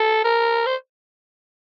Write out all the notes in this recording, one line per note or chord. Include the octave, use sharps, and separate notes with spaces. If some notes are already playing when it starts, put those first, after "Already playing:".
Already playing: A4
A#4
C5